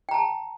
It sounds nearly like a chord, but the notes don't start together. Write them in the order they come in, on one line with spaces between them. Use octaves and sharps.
G5 A#5 A5